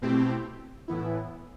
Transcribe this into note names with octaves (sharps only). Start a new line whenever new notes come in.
B2 A3 C4 E4 G4
A2 E3 B3 E4